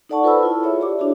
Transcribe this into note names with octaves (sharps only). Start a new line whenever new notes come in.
D#4 A4 D5 F#5 A5 C#6
F4 A4 B4 C5 B5 E6
E4 F4
G#4 C#5 E5
G4 C#5 D5 D6
D4 E4 F#4 G#4